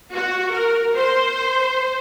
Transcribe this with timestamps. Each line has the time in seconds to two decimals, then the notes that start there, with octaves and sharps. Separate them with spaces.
0.14 F#4
0.51 A#4
0.95 C5